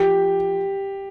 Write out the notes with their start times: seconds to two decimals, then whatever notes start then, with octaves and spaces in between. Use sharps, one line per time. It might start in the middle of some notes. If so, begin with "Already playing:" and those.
Already playing: F3 G4